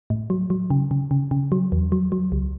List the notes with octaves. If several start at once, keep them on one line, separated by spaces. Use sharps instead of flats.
A2
F#3
F#3
C#3
C#3
C#3
C#3
F#3
E2
F#3
F#3
C#2